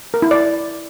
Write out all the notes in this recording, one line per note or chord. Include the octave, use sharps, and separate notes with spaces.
A#4
E4
D5